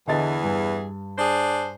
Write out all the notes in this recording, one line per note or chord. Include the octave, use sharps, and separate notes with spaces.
E2 D3 E3 G#4 D#5 A6
G2
D4 G#4 C5